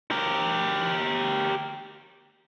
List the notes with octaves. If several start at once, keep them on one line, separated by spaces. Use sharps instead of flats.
G4 A#4